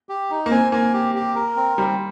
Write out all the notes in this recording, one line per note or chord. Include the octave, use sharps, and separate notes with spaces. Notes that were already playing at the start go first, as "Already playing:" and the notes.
G4
D#4
A#3
C4 G#5
A#3 G#5
G4
G4
A#4
C4
G3 C4